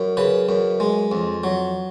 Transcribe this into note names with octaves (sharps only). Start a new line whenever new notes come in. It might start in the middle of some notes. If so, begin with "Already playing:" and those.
Already playing: F#2
C#3 B4
F#2
G#3
F2
F#3